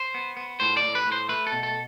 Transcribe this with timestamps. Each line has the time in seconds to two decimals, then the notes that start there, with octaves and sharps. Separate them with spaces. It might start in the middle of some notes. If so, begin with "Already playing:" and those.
Already playing: C5
0.14 B3
0.37 B3
0.60 A2 C5
0.77 D5
0.84 A2
0.95 B4
1.06 A2
1.12 C5
1.29 A3 B4
1.47 A4
1.52 B2
1.63 A4